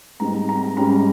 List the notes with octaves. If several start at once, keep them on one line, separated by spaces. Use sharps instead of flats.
G#2 G3 C4 D#4 A#5
A#5
G#2 G3 C#4 A#5